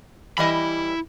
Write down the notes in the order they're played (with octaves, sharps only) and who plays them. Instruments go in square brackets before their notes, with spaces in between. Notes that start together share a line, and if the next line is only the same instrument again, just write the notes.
[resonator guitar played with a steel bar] E3 G3 D#5 [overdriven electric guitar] E4 B5